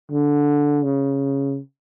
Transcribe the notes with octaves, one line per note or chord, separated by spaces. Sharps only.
D3
C#3